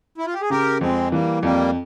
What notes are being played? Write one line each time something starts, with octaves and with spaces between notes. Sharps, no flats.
E4
F4
G4
G#4
C#3 G4 A#4
F2 G#3 C4
E3 G3 A#3
F2 G3 A#3